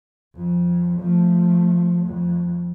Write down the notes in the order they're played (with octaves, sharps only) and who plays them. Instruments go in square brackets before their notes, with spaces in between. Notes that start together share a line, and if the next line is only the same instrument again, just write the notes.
[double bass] F2
F3 A3
F2